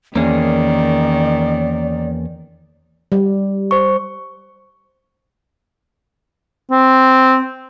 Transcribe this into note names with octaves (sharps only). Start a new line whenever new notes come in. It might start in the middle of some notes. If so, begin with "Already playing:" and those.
E2 D#3 A#3 C#4 G#4 D5
G3
C5 C#6
C4